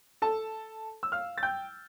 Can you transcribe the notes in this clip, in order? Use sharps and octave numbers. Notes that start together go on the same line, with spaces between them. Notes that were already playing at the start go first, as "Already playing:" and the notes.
A4 A5
E6
F5 F6
A6
G5 G6